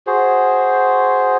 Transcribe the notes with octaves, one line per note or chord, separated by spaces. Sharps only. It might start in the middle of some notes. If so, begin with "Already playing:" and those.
F#4 G#4 C5